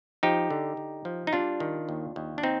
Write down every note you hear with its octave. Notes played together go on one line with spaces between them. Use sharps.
F3 D#4 G4
D3
D3
F3
D#4
G3 D4 F4
D#3
D#2
D#2
D4
C4 D#4